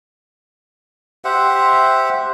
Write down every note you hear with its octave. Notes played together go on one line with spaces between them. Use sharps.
G4 C5 E5 F#5